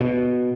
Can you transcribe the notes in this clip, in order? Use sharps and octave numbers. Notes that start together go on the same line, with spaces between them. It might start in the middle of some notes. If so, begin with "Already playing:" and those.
B2